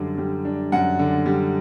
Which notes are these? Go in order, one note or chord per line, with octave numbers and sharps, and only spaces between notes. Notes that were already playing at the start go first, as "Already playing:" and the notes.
Already playing: F#2 D3 G3 D4
G3
D4
F#2 F#5
D3
G3